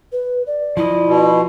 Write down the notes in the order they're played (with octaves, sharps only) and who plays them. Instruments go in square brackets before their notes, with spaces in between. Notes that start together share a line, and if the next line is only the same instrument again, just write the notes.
[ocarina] B4
D5
[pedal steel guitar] F3 D#5 [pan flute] E4
[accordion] B2